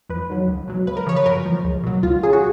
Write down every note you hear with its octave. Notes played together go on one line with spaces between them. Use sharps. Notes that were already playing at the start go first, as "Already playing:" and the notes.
F2 B4
D#3 F#3
C#2
B2 F#3
C#2 B4
A#4
C#3 F3 C#5
B4
F#2 A#4
F3
C#2
B2 F#3
C#2 F4
C#3 F#3 G#4
F#4